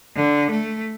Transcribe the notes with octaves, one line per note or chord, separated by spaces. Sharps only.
D3
A3